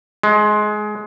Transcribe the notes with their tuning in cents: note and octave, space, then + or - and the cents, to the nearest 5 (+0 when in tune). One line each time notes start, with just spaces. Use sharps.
G#3 +20